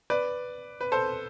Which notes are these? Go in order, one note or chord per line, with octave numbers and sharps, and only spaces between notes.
B4 D5
B4
A4 C5